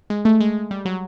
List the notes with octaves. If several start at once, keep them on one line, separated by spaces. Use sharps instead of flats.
G#3
A3
G#3
G3
F#3